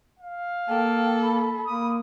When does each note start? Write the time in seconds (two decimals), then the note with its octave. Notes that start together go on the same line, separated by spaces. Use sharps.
0.19 F5
0.69 A#3 A4 G5
1.22 B5
1.66 A#3 D#6